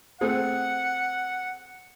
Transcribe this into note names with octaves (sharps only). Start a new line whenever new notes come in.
A3 C4 G#4 F#5